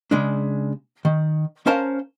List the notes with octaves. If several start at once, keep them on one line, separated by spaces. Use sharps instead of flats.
C#3 G#3 D4
D#3
C#4 A#4 C5 F5 A5 A#5